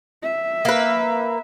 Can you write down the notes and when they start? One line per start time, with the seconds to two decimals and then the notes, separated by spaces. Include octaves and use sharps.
0.23 E5
0.65 A#3 B4